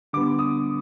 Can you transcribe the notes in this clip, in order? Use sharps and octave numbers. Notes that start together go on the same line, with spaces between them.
D3 G3 B3 D6
D#6